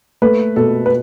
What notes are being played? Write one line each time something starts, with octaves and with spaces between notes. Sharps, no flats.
A3 B4
B2 A4
B4